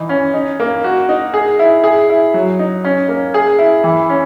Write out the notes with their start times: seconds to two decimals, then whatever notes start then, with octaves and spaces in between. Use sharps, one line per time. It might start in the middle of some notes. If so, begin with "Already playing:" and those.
Already playing: E3 D#4
0.09 C#4
0.34 D#4
0.60 A#3
0.84 F#4
1.09 D#4
1.34 G#4
1.59 E4
1.84 G#4
2.10 E4
2.34 F#3
2.59 D#4
2.84 C#4
3.08 A#3
3.34 G#4
3.59 E4
3.84 E3
4.09 C#4